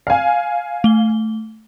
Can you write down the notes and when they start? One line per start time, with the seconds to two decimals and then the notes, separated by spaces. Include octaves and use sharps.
0.07 F5 G#5
0.84 A3 G7